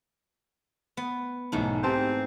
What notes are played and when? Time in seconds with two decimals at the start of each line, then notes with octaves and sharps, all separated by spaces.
0.97 B3
1.52 B1 G#2 E3 A3 D#4
1.83 E3 C4 G4 A5 C6